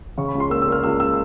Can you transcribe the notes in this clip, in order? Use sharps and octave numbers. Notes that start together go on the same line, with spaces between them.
C#3 C#6
B5
C#2
C6
A#3 E6
A#3 E6
F6
C#2 E6
E6